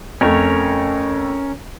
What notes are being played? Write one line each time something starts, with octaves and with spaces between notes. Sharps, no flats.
F2 A3 C#4 A#4 C#5